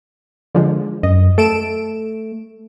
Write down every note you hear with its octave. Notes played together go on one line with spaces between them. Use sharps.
D3 F3 G#3
F#2 D#5
A3 A4 D7 E7